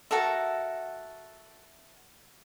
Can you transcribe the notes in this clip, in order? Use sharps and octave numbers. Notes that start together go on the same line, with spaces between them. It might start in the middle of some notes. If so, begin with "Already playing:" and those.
F#4 A4 A#4 E5